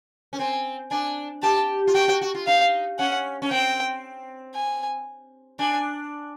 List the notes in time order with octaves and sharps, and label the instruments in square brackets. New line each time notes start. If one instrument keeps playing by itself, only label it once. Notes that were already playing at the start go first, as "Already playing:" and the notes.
[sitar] C#4
[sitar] C4 [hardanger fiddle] G#5
[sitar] D4 [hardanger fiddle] G#5
[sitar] G4 [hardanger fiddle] A5
[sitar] F4
[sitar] F#4 [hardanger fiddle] G5
[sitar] F#4
F#4
F4
[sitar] D#4 [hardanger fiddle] F5
[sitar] C#4 [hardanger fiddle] F#5
[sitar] C#4
[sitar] C4 [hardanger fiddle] G5
[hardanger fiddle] G#5
[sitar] D4 [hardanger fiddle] G#5